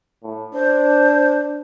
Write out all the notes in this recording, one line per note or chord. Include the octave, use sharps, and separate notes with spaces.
A2
D4 C5